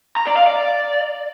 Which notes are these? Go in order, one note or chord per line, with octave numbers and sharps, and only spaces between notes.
A#5
D5
F5
D5